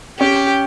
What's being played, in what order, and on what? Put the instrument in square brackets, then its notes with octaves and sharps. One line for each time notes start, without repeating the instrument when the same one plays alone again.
[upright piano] C#4 [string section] G4